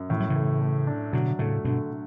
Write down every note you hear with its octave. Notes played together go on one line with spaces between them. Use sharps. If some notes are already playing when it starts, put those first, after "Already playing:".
Already playing: F#2
A2 E3
F#3
C#3 E3
A3
A3
D4
B2 D3 F#3
A2 C#3 A3
G2 B2 D3
D3